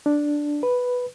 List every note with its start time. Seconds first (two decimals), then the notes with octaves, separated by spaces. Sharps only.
0.06 D4
0.63 B4